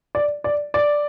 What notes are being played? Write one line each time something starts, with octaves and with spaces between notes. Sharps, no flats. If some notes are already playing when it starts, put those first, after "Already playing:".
D5
D5
D5